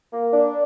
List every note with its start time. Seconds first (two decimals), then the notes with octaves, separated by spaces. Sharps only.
0.12 A#3
0.33 D4